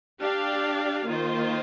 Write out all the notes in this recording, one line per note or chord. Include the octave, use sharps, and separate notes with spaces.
D4 G4 D5 F5
D#3 A#3 F4 C5